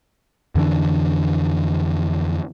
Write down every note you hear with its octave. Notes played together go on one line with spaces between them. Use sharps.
F2 D3 E3 D4